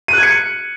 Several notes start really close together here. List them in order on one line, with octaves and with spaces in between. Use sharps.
D#7 F#6 G#6 C#7